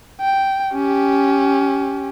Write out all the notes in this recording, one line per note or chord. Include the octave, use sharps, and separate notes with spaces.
G5
C#4 G4